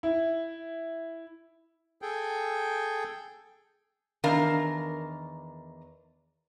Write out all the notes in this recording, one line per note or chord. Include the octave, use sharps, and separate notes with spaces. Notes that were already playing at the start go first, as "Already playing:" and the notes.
E4
G#4 A4 G5
E2 D#3 D4 A#4 F5